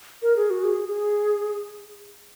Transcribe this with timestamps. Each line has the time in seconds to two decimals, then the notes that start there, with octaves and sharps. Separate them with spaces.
0.22 A#4
0.36 G#4
0.50 F#4
0.64 G#4
0.89 G#4